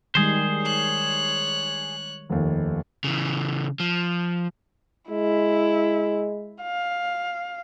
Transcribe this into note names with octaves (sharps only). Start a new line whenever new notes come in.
D#3 G3 G#3 G#4 C5
C#5 F#6
F1 D#2
C#3 E3
F3
G#3 E4
F5